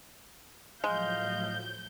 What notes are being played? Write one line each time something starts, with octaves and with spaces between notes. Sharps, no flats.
A2 F3 F#3 G#3 D#5 F5 G6